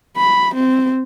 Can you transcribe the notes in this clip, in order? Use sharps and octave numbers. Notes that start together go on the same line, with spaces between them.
B5
C4